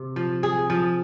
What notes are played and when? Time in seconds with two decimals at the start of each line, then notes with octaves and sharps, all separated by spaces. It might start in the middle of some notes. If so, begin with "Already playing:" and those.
Already playing: C3
0.16 F3
0.43 G#4
0.70 F3